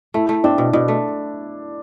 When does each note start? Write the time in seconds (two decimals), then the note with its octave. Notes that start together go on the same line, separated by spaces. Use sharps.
0.14 A3 E4
0.29 A3
0.44 C4 D4
0.58 B2
0.73 B2 D4
0.88 A3